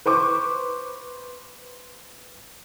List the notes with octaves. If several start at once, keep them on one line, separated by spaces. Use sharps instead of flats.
B4 C5 C#6 D6